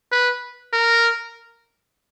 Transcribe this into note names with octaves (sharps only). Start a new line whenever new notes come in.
B4
A#4